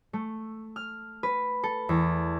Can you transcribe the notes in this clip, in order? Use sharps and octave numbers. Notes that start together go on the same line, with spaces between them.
A3
F6
B4
A4
E2